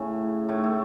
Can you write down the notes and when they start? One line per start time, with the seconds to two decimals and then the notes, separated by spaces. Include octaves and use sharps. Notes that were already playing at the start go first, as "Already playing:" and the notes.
Already playing: A2 C#3 A3
0.49 A2 A3
0.64 A3